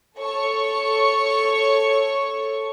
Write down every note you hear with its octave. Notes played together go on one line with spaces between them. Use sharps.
A4 C#5 C#6